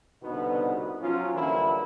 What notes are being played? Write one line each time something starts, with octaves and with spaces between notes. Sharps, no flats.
C2 B2 D3 B3 D#4 B4
F3 F#3 C#4 F4
G2 D3 E3 A#3 C#4 E4